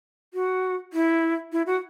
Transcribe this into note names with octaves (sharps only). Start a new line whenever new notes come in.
F#4
E4
E4
F#4